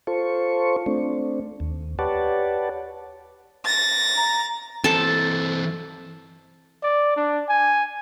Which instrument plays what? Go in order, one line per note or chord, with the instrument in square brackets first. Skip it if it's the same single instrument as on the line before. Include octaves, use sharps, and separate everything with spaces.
[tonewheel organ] F4 A4 C5 C#6
A3 C4 D4
D#2
G4 B4 C#5 D5 F#5 A5
[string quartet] A6 A#6
[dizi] A#5
[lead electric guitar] E3 C4 [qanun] A4 A5
[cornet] D5
D4
G#5